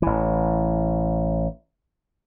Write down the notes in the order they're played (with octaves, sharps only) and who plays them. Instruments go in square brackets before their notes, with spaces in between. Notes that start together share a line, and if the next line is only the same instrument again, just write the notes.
[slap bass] A1 E3